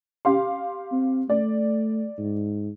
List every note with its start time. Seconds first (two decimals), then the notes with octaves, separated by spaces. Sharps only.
0.25 G4 F5 C6
0.92 C4
1.30 A3 D5
2.18 G#2